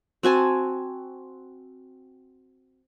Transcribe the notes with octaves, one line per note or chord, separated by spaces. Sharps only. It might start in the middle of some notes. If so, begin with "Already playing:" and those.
C4 F#4 G#5 A5